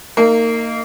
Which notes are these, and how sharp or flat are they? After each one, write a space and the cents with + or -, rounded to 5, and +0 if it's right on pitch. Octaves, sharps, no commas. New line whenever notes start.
A#3 -25 D#4 +0